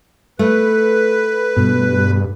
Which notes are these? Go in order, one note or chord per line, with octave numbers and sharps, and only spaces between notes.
A3 B4
G2 B2